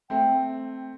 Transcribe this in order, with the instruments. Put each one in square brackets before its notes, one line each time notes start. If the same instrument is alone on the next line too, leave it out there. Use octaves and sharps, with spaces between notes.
[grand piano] A3 C4 [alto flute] G5